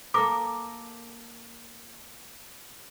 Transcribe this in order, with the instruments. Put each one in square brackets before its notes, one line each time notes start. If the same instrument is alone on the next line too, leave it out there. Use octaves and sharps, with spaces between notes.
[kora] A#3 A4 A#4 [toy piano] D6